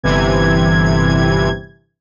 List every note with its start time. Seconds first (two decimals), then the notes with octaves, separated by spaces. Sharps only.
0.03 G1 C3 E3 G#6